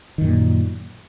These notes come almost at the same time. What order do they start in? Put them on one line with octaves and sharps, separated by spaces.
D#3 F#2 A#2